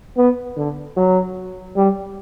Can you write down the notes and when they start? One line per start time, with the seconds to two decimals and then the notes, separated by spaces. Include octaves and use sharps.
0.17 B3
0.57 D3
0.96 F#3
1.76 G3